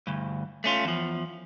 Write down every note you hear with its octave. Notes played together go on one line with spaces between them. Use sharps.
D2 G2
A3 C#4 F4
E2 F3